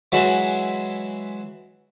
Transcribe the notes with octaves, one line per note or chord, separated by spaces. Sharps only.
E3 F#3 G#3 E4 F#4